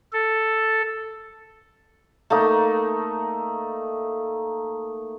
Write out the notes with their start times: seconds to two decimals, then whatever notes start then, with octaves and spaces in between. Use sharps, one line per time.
0.13 A4
2.30 A3 A#3 D#4